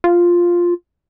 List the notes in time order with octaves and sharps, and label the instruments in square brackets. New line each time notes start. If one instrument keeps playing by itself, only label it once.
[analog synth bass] F4